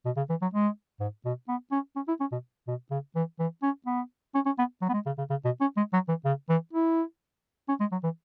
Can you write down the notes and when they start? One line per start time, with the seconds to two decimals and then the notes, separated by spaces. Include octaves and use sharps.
0.06 B2
0.17 C#3
0.30 E3
0.42 F#3
0.54 G#3
1.00 G#2
1.25 B2
1.49 B3
1.72 C#4
1.96 C#4
2.08 E4
2.20 C#4
2.32 B2
2.68 B2
2.91 C#3
3.16 E3
3.40 E3
3.63 C#4
3.86 B3
4.35 C#4
4.46 C#4
4.59 B3
4.82 F#3
4.89 B3
4.94 G#3
5.06 C#3
5.18 C#3
5.30 C#3
5.45 B2
5.61 C#4
5.77 G#3
5.93 F#3
6.09 E3
6.25 C#3
6.49 E3
6.73 E4
7.69 C#4
7.80 G#3
7.92 F#3
8.04 E3